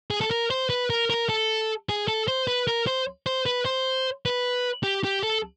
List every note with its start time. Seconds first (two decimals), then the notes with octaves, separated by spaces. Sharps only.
0.11 G#4
0.21 A4
0.31 A#4
0.51 C5
0.70 B4
0.90 A#4
1.10 A#4
1.29 A4
1.89 G#4
2.08 A4
2.28 C5
2.48 B4
2.67 A#4
2.87 C5
3.26 C5
3.46 B4
3.65 C5
4.26 B4
4.84 G4
5.04 G4
5.23 A4